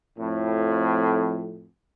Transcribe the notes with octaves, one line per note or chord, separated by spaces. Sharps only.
F2 A2